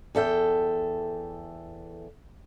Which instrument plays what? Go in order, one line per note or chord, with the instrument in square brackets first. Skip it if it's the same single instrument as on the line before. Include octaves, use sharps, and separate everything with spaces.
[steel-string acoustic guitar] E2 A4 E5 G5